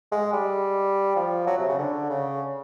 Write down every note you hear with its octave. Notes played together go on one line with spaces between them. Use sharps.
G#3
G3
F3
F#3
C3
C#3
D3
C#3